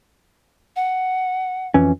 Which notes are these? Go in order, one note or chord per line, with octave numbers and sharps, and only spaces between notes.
F#5
F2 E3 C#4